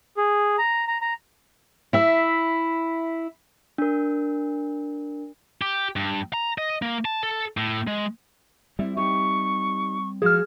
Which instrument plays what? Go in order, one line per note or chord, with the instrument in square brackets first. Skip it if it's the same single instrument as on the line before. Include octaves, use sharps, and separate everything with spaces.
[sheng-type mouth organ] G#4
A#5
A#5
A#5
[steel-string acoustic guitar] E4 E5
[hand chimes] D4 A#4
[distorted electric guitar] G4
G2
A#5
D#5
A#3
A5
A4
A2
G#3
[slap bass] G3 C4 [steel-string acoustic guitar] E4
[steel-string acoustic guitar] D#4 G4 C#5 [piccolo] C#6
[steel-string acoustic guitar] F3 G#3 F#4 [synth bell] G#4 F6